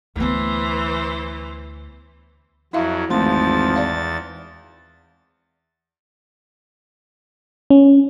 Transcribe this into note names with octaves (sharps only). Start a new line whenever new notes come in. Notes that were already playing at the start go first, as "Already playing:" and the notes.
D2 E3 B3 C5
F2 F#3 E4 E5 F5
G#1 E2 F3 A3 C6 A6
D5 F5
C#4